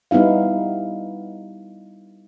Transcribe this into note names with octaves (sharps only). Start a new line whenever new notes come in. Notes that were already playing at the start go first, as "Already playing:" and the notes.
G3 B3 D#4 E4 F5